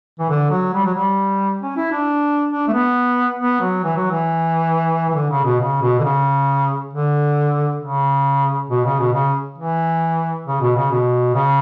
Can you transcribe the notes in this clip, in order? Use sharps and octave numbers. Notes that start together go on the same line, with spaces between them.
E3
D3
F#3
G3
F#3
G3
C#4
E4
D4
D4
A3
B3
B3
F#3
E3
F#3
E3
E3
D3
C#3
B2
C#3
B2
D3
C#3
D3
C#3
B2
C#3
B2
C#3
E3
C#3
B2
C#3
B2
C#3